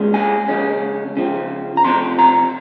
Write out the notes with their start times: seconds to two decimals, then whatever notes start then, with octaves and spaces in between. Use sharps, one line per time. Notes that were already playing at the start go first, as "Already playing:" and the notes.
Already playing: A#2 G#3 C#4
0.14 G#5
0.48 F2 C#3 G#3 C#4
1.17 C#3 F3 C4
1.77 A#5
1.84 C3 F3 C4 C6
2.19 A#5